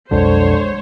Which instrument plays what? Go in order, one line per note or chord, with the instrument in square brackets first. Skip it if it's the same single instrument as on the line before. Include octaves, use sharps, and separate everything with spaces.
[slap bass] B1 F2 F3 [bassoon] D3 [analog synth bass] G#3 [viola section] C5 C#5